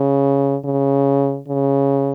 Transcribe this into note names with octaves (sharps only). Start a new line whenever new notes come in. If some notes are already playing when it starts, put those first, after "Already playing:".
Already playing: C#3
C#3
C#3